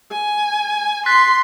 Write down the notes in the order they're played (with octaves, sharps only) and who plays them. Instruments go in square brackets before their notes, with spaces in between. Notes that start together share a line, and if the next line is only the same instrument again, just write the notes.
[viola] G#5
[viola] C6 [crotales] F#6 A6 B6